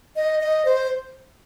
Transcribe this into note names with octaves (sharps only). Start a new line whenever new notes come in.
D#5
D#5
C5